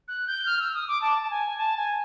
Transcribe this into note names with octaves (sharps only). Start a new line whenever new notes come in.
F#6
G6
F6
E6
D#6
D6
A5
A5
G#5
A5
G#5